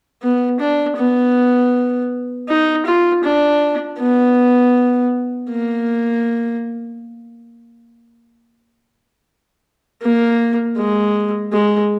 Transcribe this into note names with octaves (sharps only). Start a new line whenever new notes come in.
B3
D4
B3
D#4
F4
D4
B3
A#3
A#3
G#3
G#3